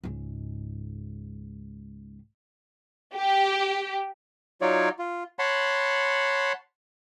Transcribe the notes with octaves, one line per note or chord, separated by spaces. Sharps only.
C#2 G#2
G4
F#3 D#4 F4 C#5 D5
F4
C#5 F#5 A5 B5 C6